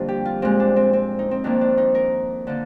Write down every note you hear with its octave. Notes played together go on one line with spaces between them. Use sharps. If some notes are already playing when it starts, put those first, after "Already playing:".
Already playing: F2 D3 G3 A#3 C4 D4 F4
G4
F4
A#2 G#3 C4
D4
C4
C4
D#4
C4
F2 D#3 A#3 D4
D4
D#4
A#4
D3 F3 A#3